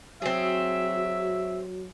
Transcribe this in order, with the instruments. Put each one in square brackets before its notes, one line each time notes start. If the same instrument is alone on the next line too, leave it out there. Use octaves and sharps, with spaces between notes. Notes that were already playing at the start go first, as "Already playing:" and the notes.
[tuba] F#3 [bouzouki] C4 G#4 [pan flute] F#4 [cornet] E5